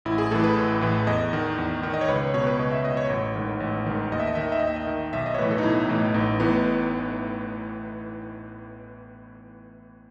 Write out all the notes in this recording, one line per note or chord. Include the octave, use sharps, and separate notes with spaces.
A1 E4
G#4
A2 E3 A4
B4
A1
A2 E3
E2 D#5
D#3
E2
D#3
D#5
C#5
C#2 B4
C#5
B2 C#5
B4
C#2 D#5
E5
B2 D#5
C#5
A1 C#5
G#2 D#3
A1
G#2 D#3
D#2 D#5
E5
D#5
D#3 E5
D#5
E5
D#2 D#5
E5
D#5
D#3
B1 E5
D#5
C#5
A2 E3 B4
A4
D#4
B1 E4
A2 E3
A1 D#4
A2 E3 B3